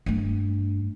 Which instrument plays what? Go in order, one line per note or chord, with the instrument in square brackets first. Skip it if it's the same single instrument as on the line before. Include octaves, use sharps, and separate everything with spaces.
[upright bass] G2 A3